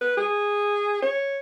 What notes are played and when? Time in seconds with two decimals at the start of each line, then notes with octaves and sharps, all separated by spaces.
0.01 B4
0.17 G#4
1.03 C#5